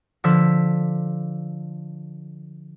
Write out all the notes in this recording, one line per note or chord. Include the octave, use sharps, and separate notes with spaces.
D3 F3 E6 B6